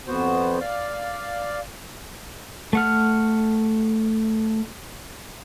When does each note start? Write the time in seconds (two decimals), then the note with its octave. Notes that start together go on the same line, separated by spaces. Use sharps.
0.07 F2 B3 F#4 C5
0.61 D5 F5
2.73 A3 F#5 F6